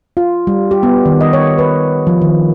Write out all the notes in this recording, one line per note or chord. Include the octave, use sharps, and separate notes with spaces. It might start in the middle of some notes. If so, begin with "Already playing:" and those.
F4
G3
G4
B3
D#3
D#5
C#5
B4
F3
D#3